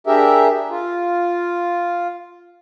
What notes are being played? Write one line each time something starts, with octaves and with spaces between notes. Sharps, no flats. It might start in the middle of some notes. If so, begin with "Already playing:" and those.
D4 G4 G#4 A#4 E5
F4